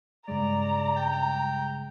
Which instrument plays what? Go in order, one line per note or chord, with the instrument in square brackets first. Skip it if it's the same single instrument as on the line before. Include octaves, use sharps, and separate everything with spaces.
[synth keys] G2 C#3 G#3 [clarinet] D5 [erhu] A#5
[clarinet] G5